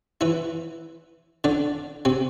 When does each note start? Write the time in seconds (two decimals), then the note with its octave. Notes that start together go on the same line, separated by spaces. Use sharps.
0.21 E3 E4
1.44 D3 D4
2.05 C3 C4